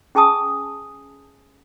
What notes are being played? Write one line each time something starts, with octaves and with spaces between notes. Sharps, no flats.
C#4 G#4 G#5 A5 D#6